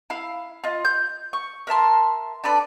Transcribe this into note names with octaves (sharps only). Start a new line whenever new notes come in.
E4 F5
F4 D#5
G6
C#6
A#4 E5 A5 C6
D4 A4 B4 D5